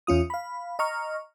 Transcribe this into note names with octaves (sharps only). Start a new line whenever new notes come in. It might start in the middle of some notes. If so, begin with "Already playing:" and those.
E2 C#4 F4 D#6
F5 B5
D#5 A#5 C#6 F6